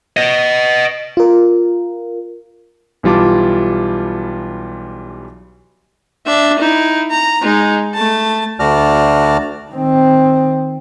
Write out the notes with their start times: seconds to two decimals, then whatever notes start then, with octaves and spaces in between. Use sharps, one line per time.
0.17 B4 D#5
1.17 F4 A#4
3.03 B1 E3 G3 F4 A5 D6
6.27 D4 E5
6.59 D#4 E4
7.11 A#5
7.42 G#3 D#4
7.94 A3 A5
8.60 D2 F#4 D5 A5 F6
9.71 D#3 C4